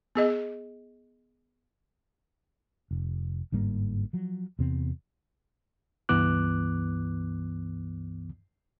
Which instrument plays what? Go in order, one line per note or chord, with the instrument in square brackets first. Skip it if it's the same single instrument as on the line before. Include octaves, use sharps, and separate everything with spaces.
[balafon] B3 G#4 D#5
[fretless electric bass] F1
G1 G#2 G3 A#3
F3 F#3
E2 C3 B3 C4
[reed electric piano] C#2 G2 E3 B3 D6 F#6